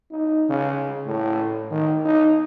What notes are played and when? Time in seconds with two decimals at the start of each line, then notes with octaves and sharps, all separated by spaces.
0.11 D#4
0.49 C#3
1.06 A2
1.71 D#3
2.05 D#4